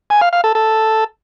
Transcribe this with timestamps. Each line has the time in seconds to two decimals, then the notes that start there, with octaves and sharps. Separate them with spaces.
0.10 G#5
0.21 F5
0.33 F5
0.44 A4
0.55 A4